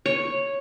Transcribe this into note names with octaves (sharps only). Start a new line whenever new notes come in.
C#5